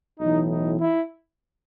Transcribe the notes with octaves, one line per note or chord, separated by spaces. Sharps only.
B1 A2 E3 D#4
D#4
E4